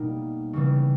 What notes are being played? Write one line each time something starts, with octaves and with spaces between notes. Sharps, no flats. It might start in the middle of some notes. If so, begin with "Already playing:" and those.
Already playing: B2 G3 A#3 D#4
C#3 E3 G3